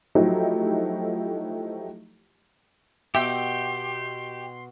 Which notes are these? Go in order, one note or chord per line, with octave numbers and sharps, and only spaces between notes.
F3 F#3 A3 D#4 E4 G4
B2 G4 E5 G5 C6